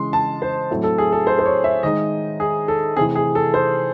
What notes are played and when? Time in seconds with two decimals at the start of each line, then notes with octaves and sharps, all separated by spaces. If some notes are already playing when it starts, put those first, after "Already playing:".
Already playing: C#3 E3 G#3 C6
0.13 A5
0.42 C5
0.70 A2 F#3 A3 C4 E4
0.84 A4
0.98 G#4
1.12 A4
1.27 C5
1.39 C5
1.46 C#5
1.64 E5
1.83 D#3 G#3 D#4 D#5
2.40 G#4
2.68 A4
2.96 C3 E3 A3 C4 G#4
3.16 G#4
3.35 A4
3.54 C5